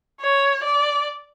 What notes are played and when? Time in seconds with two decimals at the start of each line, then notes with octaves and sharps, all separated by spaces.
0.21 C#5
0.64 D5